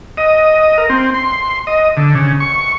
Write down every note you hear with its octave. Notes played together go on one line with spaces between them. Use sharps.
D#5
A#4
C4
C6
D#5
D3
C#3
C#6